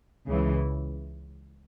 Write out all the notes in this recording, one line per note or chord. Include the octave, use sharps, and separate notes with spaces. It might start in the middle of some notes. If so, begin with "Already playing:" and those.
C#2 C#3 E3